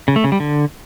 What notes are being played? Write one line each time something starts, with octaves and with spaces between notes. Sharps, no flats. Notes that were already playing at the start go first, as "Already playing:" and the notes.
C#3
A3
C#3
G3
D3